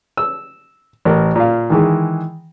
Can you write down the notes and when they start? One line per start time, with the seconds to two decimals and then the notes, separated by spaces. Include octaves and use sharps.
0.17 E6
1.05 A1 A#4
1.36 A#2 F5
1.70 D#3 E3 G#3